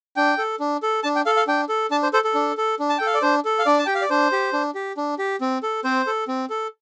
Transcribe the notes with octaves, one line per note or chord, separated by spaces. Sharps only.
D4 G5
A4
D4
A4
D4 A5
G5
A4 F5
F5
D4 G5
A4
D4 A5
C5
A4 C5
A4
D4
A4
D4
A5
A4 G5
F5
D5
D4 C5
A4
F5
D4 D5
A5
G4 G5
F5
D5
D4 C5
G4
D4
G4
D4
G4
C4
A4
C4 C5
A4
C4
A4